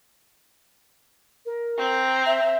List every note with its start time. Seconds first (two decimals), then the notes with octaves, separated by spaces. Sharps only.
1.46 A#4
1.78 C4 A#5
2.26 E5